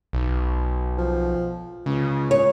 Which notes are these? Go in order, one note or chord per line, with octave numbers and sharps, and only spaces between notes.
B1
F3
C#2 C#3
C#5